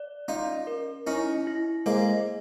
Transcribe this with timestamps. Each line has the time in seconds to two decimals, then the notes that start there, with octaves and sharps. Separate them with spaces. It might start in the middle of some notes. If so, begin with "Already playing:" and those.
Already playing: D5
0.28 C#4 D#4 F4
0.67 A#4
1.07 C#4 D#4 E4
1.47 E4
1.86 G#3 A#3 C5